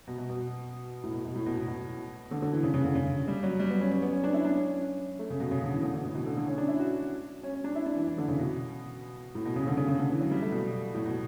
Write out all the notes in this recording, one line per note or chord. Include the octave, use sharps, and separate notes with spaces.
B2
B2
B2
A2
B2
B2
A2
B2
A2
B2
D3
D3
E3
C#3
C#3
D3
C#3
G3
F#3
G3
B3
C#4
C#4
B3
C#4
D4
E4
D4
C#4
A3
C#3
B2
C#3
D3
E3
D3
D3
A2
B2
D3
D3
C#4
D4
E4
F#4
C#4
C#4
D4
E4
D4
E3
E3
D3
C#3
B2
A2
B2
C#3
D3
C#3
C#3
D3
E3
F#3
G3
A3
B2
A2
B2